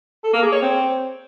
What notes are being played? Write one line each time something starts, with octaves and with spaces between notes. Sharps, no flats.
A4
A#3
G#4
C#5
C4